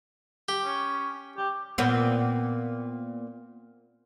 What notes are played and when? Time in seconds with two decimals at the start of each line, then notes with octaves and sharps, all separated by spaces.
0.49 G4
0.64 C#4
1.37 G4
1.78 A#2 B3 C4